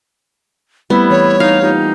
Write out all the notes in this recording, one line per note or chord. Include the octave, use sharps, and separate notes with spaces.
G3 A3 B3 C4 E4
E3 C#5
D#4 F5
A#3 D#4 F4 G4